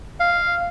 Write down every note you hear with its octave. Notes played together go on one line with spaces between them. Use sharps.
F5